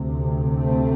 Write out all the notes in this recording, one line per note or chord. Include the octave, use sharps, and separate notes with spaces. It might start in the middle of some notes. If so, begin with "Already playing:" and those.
Already playing: D2 C3
A3 C4